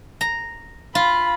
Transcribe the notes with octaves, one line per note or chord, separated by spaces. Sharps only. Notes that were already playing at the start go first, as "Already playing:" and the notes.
A#5
F4 B5